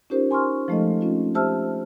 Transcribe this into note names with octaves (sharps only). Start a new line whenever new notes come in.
C#4 D#4 F4 G4 A#4 C5
G#5 C6 C#6 F6
F3 G#3 A3 D#4 A4 D#5
C4 C#4 F4
G4 C5 E5 A5 E6 F6